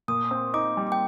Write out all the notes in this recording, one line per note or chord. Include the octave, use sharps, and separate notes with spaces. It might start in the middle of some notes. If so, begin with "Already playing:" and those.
A#2 D#6
C4
D#4 D6
G3
G5